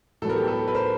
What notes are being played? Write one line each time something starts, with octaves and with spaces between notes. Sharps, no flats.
A2 F#3 B3 A4 A#4
G4 A4
A4 B4
B4
A#4 C5